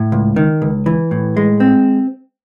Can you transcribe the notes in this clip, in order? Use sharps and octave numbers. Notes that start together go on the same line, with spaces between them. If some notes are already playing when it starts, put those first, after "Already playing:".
Already playing: A2
C#2
D#3
C#2
E3
A2
G#3
C4